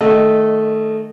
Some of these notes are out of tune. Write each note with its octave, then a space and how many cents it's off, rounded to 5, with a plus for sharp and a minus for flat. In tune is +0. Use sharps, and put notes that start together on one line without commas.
D#3 -25 A3 -10 D#5 -10